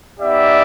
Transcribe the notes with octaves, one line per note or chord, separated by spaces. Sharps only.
B3 D#4 G4 D5 E5